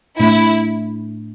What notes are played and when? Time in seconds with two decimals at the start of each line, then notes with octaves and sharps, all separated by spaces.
0.19 A2 A3 D4 E4